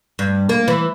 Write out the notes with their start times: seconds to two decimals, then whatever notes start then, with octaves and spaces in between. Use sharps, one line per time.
0.19 G2
0.49 A#3
0.68 E3